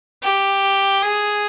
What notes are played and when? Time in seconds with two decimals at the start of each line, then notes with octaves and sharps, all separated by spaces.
0.23 G4
1.03 G#4